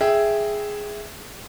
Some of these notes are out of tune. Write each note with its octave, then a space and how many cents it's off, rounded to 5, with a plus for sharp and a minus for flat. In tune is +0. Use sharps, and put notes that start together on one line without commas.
G#4 +0 E5 +0 G5 +0